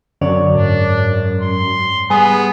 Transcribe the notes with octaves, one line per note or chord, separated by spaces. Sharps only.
F#2 D3 C#5 D5
G#2 D4
C6
G3 B3 G#4 G#5 D#6